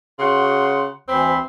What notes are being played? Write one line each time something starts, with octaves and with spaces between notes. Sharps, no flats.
C#3 F#4 F#5 C6
D2 E3 C4 B5